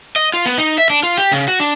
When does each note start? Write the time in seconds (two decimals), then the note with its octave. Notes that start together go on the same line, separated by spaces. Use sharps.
0.16 D#5
0.34 F4
0.46 B3
0.58 D#4
0.78 E5
0.90 D4
1.03 F4
1.17 G4
1.32 C#3
1.48 F#4
1.60 D4